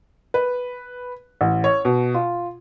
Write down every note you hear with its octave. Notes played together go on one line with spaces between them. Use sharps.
B4
A1
C#5
B2
F4